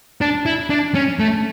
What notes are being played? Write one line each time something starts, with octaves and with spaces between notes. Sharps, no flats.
D4
E4
D4
C#4
A3